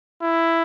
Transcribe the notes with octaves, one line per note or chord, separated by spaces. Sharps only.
E4